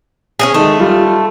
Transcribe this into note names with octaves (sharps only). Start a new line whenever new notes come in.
C#4 D#4 G#4
D#3 G#3 A3
G3 F4